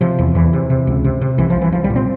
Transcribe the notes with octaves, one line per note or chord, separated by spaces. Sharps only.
C3 F3
E2
E2 E3
C3
C3
C#2
C3
C3
C2 E3
F3
C2
E3
C2 F3
G3
A#2
C4